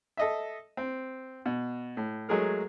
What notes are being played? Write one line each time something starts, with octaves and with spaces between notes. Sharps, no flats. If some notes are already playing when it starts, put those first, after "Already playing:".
A4 D#5 E5
C4
B2
A2
F#3 G#3 A3 G#4 A#4